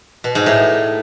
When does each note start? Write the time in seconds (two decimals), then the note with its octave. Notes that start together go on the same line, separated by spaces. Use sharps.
0.24 B2
0.35 G#2
0.46 A2